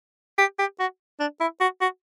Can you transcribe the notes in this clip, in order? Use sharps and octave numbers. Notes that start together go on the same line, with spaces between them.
G4
G4
F#4
D4
E4
F#4
F#4